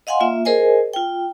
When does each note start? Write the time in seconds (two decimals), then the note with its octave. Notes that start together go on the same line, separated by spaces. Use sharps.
0.07 D#5 F5 F#5 G#5 C6
0.20 A#3 F4 E5
0.45 G#4 A#4 C5 D#5 G#5
0.94 F4 G5